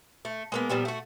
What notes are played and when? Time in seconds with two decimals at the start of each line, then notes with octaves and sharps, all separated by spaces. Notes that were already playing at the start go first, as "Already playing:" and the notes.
0.25 A3
0.52 G#3 A#3 B3
0.69 A#2 F3 G3 B3
0.85 A3 F#4